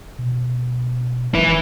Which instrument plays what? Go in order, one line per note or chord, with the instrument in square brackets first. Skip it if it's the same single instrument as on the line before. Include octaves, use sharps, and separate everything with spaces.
[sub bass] B2
[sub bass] F1 [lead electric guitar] E4 B4